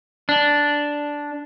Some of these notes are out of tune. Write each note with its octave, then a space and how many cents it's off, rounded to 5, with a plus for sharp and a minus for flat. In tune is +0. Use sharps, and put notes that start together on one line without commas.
D4 -5